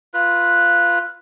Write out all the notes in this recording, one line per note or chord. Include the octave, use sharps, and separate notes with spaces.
F4 B4